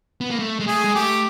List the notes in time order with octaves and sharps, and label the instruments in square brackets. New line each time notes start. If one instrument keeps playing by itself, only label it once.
[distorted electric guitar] B3
A#3
A3
G#3
[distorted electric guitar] A3 [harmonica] G#4
[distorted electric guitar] G#3
[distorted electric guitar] A3 [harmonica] G4